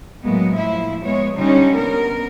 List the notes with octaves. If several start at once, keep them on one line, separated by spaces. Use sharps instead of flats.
A2 F#3 G#3 A#3 B3
F3 E4
G#3 B3 C#5
D3 G3 C#4 D#4
B3 A#4